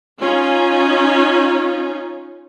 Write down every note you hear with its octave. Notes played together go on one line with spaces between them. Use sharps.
C#4 D#4 F4